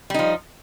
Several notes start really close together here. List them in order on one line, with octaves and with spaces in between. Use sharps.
G3 D#4 F3